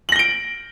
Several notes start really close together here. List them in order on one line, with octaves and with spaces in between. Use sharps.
F#7 A#6 G7 D7